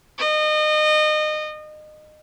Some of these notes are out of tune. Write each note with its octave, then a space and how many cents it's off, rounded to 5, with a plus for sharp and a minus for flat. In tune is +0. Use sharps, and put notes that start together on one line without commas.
D#5 -30